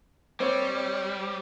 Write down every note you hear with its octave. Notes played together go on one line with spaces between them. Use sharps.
G3 C4 C#5